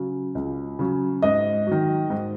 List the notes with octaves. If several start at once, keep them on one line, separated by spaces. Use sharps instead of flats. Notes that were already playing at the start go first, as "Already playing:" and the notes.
Already playing: C#3 F#3
C#2
C#3 F#3
G#2 D#5
D#3 F#3
G#2